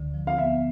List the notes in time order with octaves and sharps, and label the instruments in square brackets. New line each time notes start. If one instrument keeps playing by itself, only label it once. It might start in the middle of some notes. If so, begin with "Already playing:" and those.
Already playing: [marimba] D2 D3
F3
[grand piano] F5
[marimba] B3 [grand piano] E5